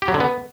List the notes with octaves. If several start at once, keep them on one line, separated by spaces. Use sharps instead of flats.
G4
F#3
D3
B3